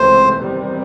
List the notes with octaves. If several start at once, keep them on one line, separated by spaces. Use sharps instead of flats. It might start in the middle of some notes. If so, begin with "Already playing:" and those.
Already playing: C#2 C3 E3 A3 C4 C5
E2 C3 D#3 G3 C4